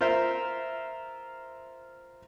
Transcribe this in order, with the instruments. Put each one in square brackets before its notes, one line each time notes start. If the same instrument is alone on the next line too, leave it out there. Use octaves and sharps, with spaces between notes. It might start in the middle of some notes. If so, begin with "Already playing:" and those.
[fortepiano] F4 A#4 C5 E5